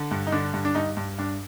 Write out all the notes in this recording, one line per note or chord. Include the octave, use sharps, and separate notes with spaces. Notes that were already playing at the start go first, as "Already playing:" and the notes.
Already playing: D3
G2
D#4
D3 D4
G2
D4
G2 D#4
G2
G2 D4